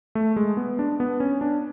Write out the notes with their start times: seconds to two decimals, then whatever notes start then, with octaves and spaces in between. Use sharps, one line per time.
0.15 A3
0.36 G#3
0.57 B3
0.79 D4
1.00 B3
1.20 C#4
1.41 D4